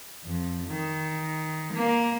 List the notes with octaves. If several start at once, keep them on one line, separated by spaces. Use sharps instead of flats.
F2
D#3
A#3